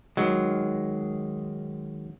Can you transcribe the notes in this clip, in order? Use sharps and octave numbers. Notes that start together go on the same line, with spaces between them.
D#3 F#3 G#3